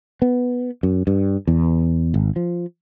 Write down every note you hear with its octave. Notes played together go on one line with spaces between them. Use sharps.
B3
F#2
G2
E2
G#1
F3